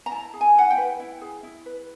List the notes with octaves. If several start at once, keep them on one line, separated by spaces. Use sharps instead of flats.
A#5
E4 A5
G#4
G#5
E4 F#5
G5
B4
E4
G#4
E4
B4